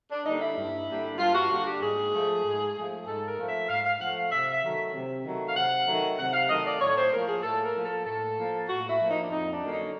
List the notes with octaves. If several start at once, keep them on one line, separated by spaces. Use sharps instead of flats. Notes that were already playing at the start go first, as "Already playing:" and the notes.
D4
D3 G3 A#3 D4 D#4
E4
G2
D3 G3 A#3 D4
G2 F4
F#4
D3 G3 A#3 D4 F#4
G4
G#2 G#4
F3 A3
G#2
F3 A3
G#2 A4
A#4
F3 A3
E5
G#2 F5
F5
F3 A3 F#5
F5
C3 E5
E5
D#3 F#3 A3
C3
D#3 F#3 A3
F5
C3 F#5
D#3 F#3 A3
C3 F#5
F5
D#3 F#3 A3 D#5
D5
A2 C#5
C5
F3 A#3 A#4
G#4
A2 A4
A#4
F3 A#3
A4
A2 A4
F3 A#3
A2 F#4
E4
F3 A#3
D#4
D4
F2 D#4
D4
D3 F#3 A#3 C#4
D#4